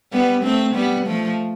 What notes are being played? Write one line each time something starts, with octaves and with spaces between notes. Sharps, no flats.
G3 B3
A3 C4
G3 B3
F3 A3